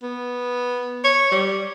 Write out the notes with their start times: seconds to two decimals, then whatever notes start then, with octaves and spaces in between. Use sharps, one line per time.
0.03 B3
1.04 C#5
1.31 G3